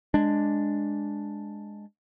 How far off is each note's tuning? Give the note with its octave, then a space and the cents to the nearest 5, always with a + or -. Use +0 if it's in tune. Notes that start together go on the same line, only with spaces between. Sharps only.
G#3 +0 D4 +0